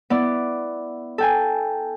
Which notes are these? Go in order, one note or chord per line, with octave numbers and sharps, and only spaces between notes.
B3 E4 D5
A4 G5 G#5